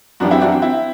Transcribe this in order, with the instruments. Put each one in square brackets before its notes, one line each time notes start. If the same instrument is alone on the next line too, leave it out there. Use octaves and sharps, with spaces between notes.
[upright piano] F#2 E3 G3 D4 F#4
C4 E4
D4 F#4
C4
C4 E4